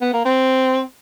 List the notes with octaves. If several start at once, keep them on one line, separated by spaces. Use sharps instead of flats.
B3
A#3
C4